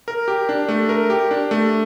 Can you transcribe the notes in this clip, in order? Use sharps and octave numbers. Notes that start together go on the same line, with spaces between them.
A#4
G4
D4
A3
A#4
G4
D4
A3